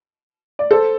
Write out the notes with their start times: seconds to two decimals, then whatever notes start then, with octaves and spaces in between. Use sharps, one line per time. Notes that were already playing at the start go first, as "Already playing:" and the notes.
0.59 D5
0.71 A4 C5